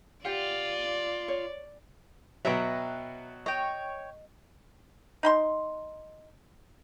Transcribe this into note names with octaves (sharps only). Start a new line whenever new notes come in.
F4 G4 D5 F#5
C#5
B2 F#3 B4 E5 G5 A#5
C#5 D#5 G5
D#4 B5 C6